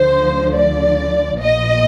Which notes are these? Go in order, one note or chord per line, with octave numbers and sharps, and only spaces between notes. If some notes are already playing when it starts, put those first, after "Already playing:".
Already playing: D2 D3 F3 C5
D5
A#1 A#2 F3 D#5